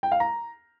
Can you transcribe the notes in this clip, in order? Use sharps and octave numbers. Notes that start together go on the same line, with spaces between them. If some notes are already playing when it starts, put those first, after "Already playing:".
G5
F5
A#5